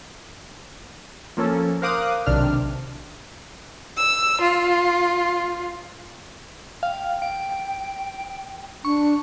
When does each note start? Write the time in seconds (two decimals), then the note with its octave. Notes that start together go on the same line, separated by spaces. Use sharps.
1.37 F3 A#3 C#4 A4
1.82 A#4 C5 F5 D6 D#6 F#6
2.26 B1 C3 D#3 D4 F6
3.96 E6
4.41 F4
6.83 F5 G5
7.22 D7
8.85 D4 C#6